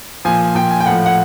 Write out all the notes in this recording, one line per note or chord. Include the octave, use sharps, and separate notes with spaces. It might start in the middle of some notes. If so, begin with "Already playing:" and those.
A#2 F3 G#5
A#2 F3 G5
G#5
G5
A2 F3 F#5
F#5